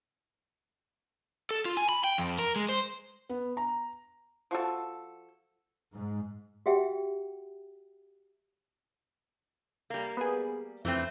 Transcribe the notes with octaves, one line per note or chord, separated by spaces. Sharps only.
A4
F4
G#5
B5
G5
F2
A#4
G#3
C5
B3
A#5
F3 F#4 A4
G#2
F#4 G4 E5 F#5 G5
G3 A#3
B3 G#4
F2 E3 A3 C4